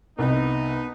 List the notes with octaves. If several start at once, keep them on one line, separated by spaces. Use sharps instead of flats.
C2 B3 D#4